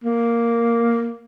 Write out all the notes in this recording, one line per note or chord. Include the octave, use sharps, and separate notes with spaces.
A#3